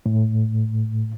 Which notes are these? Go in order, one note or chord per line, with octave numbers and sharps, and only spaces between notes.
A2